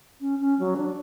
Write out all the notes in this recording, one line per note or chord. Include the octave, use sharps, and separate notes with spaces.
C#4
C#4
F#3
D4